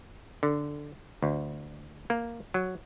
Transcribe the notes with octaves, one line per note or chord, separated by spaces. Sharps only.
D3
D2
A#3
F#3